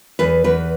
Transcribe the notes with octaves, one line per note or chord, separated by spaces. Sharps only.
E2 B4
E2 B4